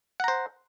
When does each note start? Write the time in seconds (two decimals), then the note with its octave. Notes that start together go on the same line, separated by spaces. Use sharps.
0.20 F#5
0.24 A#5
0.28 C5